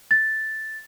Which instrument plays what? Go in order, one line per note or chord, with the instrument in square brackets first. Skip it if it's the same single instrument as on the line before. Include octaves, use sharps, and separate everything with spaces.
[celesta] A6